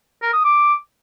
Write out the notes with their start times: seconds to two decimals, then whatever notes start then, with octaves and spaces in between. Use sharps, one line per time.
0.22 A#4
0.33 D#6
0.44 D6